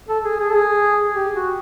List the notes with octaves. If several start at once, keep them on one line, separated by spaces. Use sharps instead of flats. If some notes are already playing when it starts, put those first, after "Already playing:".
A4
G#4
G#4
A4
G#4
G4
F#4